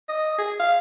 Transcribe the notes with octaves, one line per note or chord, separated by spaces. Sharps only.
D#5
G#4
F5